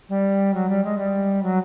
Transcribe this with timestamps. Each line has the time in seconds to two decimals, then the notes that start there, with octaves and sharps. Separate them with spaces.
0.09 G3
0.54 F#3
0.69 G3
0.84 G#3
0.98 G3
1.42 F#3